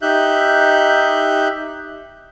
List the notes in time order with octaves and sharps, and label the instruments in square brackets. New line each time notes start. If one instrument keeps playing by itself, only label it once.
[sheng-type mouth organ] D#4 G4 E5 F#6 G6